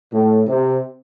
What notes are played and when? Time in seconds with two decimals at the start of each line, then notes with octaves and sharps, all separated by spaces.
0.13 A2
0.47 C3